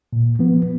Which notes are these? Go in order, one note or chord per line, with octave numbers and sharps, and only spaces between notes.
A#2
F3 B3